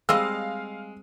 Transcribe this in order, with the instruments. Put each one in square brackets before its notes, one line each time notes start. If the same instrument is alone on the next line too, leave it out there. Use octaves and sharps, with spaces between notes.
[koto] G3 C4 D#5 [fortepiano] G#3 [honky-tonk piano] F5 [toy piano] E6